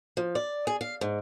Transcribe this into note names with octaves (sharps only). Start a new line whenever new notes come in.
F3
D5
G#4
F5
G#2